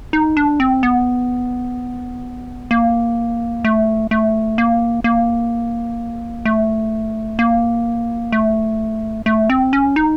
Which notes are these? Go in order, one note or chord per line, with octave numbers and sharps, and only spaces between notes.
D#4
D4
C4
B3
A#3
A3
A3
A#3
A#3
A3
A#3
A3
A3
C4
C#4
D#4